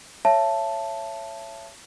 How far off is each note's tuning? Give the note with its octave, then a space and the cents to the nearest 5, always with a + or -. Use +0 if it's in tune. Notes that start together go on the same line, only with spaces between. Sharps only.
C#5 -5 E5 +25 A5 +0